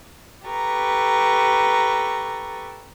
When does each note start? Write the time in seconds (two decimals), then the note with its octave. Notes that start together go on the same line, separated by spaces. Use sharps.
0.46 G4 A4 B4 A#5 C#6